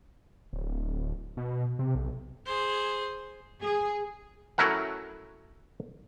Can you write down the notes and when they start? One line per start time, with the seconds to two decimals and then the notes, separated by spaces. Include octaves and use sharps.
0.53 D1
1.37 B2
1.79 C3
1.95 B1
2.46 G#4 C5
3.64 G#4
4.58 F#3 A3 C#4 E4 A#4 F#5